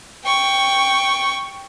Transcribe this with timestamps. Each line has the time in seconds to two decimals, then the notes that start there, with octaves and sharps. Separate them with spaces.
0.25 G5 C#6